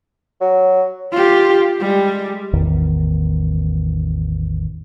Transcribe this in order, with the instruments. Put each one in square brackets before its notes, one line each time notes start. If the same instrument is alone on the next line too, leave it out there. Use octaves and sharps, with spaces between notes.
[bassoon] F#3
[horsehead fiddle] F4 G4
G3 G#3
[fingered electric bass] A1 E2 D#3